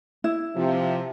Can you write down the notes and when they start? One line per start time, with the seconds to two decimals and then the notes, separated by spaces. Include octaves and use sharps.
0.24 E4
0.56 C3 F3